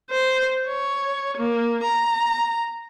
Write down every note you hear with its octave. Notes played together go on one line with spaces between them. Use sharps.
C5
C#5
A#3
A#5